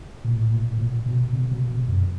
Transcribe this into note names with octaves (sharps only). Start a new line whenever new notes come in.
A#2
A2
A#2
A#2
B2
C3
B2
B2
F#2